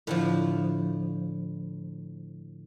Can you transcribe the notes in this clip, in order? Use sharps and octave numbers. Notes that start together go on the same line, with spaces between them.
A2 D3 F3